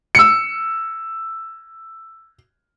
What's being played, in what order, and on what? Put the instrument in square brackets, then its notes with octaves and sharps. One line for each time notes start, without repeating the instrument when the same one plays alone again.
[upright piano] E6 C#7